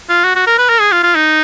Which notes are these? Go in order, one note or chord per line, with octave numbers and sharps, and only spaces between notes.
F4
F#4
F#4
A#4
B4
A#4
G#4
F4
F4
D#4